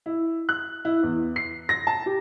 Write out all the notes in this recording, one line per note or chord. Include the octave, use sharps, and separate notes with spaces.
E4
F#6
E4
E2
C7
A#6
A5
G4